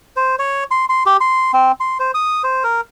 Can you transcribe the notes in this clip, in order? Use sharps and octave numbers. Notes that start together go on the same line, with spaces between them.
C5
C#5
C6
C6
G4
C6
C4
C6
C5
D#6
C5
A#4